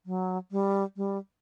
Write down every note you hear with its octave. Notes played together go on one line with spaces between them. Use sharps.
F#3
G3
G3